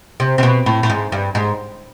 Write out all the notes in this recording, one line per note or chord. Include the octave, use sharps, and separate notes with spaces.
C3
C3
B2
A2
A2
G#2
G2
G#2